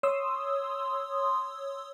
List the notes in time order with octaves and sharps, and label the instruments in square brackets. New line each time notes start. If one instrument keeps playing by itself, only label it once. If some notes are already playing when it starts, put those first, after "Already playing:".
[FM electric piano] C#5 C6 D#6 E6